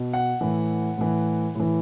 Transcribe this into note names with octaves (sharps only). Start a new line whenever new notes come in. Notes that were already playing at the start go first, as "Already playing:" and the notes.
Already playing: B2
F#5
A2 E3
A2 E3
A2 E3